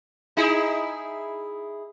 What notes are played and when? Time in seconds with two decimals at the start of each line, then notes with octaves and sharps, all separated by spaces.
0.37 D#4 E4 G#4